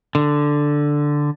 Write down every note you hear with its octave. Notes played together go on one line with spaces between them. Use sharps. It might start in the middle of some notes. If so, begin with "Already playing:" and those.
D3